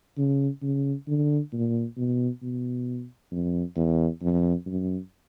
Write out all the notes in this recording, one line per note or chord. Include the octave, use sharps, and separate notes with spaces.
C#3
C#3
D3
A#2
B2
B2
F2
E2
F2
F#2